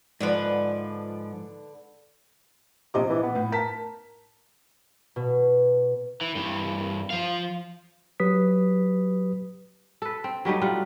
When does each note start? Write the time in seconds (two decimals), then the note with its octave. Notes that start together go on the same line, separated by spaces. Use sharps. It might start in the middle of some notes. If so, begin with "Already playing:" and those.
0.21 G#2 D3 F3 D4 B4
2.94 A#1 C3 D#5 D6
3.10 E3
3.23 B3
3.35 A2
3.52 A#4 A5 B6
5.16 B2
6.21 E3
6.35 G2 E3
7.10 F3 F5
8.20 F#3 G4 B4 D#6 B6
10.02 A4 B4
10.24 C4
10.45 F#3 G3 A3 D#4
10.61 G3 F4 F#5